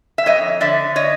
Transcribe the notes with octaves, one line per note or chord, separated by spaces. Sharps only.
E5
F2 C#5 D#5
D3 D5 E5
C#5 D#5